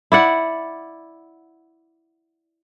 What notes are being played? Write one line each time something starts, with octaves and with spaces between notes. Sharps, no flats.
E4 D5 F#5